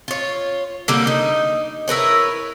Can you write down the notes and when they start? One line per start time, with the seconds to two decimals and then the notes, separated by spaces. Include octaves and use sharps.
0.08 F4 C#5
0.88 D3 G3 A#3
1.07 D#4
1.88 E4 A#4 B4 C#5